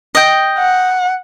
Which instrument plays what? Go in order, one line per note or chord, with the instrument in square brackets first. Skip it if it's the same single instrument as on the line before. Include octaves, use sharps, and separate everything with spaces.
[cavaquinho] D#5 G5
[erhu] F#5